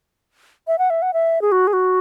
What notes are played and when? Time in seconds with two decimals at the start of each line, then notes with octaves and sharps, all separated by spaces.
0.67 E5
0.78 F#5
0.90 E5
1.02 F#5
1.14 E5
1.42 G#4
1.52 F#4
1.67 G#4
1.73 F#4